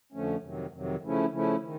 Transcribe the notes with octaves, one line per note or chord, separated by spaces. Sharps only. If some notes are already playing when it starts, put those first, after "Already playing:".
F2 D3 F3 A3 C#4
F2 C3 D#3 F#3
F2 C3 D#3 F#3
C#3 F3 A3 C#4 E4
C#3 F3 A3 C#4 E4
D#3